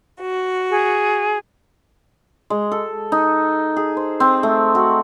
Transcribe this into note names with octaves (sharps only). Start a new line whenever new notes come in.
F#4
G#4
G#3
A4
D#4
G#4
C5
C4
A3
F#4